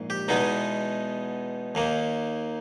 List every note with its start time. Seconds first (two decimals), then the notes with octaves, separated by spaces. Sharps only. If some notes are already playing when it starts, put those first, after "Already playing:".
Already playing: A#1 G#2
0.10 G4
0.28 E2 B2 G#3 B3 D#4
1.75 D#2 D#3 A#3